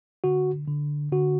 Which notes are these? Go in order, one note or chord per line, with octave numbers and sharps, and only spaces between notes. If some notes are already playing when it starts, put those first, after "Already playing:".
D3 F#4
D3
D3 F#4